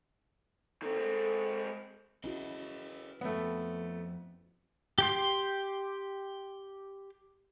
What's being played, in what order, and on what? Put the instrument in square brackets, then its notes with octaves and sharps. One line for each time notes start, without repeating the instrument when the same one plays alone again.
[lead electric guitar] D#3 C4 [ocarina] A4
[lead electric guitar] G#3 C4
[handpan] C#4 E4 F#4 [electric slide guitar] G#4 B4 D#5
[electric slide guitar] F2 [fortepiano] A3 B3
[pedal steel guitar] G4 G5 C6